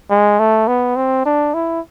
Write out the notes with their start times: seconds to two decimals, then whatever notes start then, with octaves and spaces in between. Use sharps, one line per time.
0.10 G#3
0.40 A3
0.68 B3
0.97 C4
1.26 D4
1.54 E4